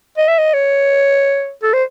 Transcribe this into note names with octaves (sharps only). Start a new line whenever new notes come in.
D#5
E5
D#5
C#5
A4
C5